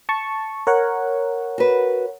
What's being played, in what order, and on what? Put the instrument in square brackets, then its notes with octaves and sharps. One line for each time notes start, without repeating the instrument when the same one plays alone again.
[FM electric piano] A5 C#6
A#4 C#5 F#5
[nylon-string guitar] F#4 B4